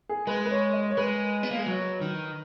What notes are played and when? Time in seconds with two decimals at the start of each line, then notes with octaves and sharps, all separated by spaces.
0.09 G#4
0.27 G#3 B4
0.45 B4
0.51 C#5
0.73 D#5
0.90 C#5
0.97 G#3 B4
1.43 B3
1.51 A#3
1.59 G#3
1.66 F#3
2.01 D#3